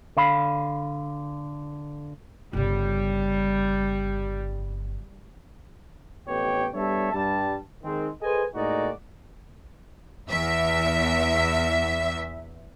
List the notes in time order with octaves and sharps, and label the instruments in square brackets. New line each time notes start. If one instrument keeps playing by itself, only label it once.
[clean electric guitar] D3 F5 B5
[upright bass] G1 C#3 [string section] G3
[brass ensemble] A1 F2 B3 G4 C#5 G5
G3 B3 D4 A4 C#5 E5
G2 G3 A5
D#3 G#3 C4
G#4 A4 B4 C5 D#5 G#5
A2 G#3 A#3 D#4 F#4 D5
[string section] E2 E5